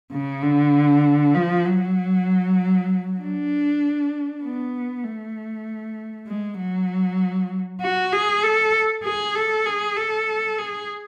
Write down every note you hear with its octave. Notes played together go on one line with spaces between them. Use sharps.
C#3
D3
F3
F#3
D4
B3
A3
G#3
F#3
F#4
G#4
A4
G#4
A4
G#4
A4
G#4